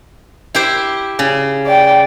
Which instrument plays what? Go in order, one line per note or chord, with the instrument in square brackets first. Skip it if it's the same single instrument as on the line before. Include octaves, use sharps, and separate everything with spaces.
[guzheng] E4 G4 C5
C#3
[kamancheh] D5 G5